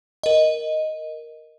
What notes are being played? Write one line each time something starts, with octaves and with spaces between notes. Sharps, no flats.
A#4 D#5